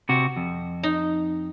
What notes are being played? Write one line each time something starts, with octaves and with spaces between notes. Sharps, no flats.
C3 F#4
F2
D#4